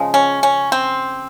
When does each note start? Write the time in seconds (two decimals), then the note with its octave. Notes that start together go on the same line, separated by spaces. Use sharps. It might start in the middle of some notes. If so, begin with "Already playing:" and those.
Already playing: C#3 F3 G#3
0.14 C#4
0.43 C#4
0.72 C4